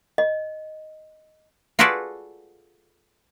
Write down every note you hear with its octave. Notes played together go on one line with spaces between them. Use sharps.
D#5
F4 F#4 G#4 A4 B4 D5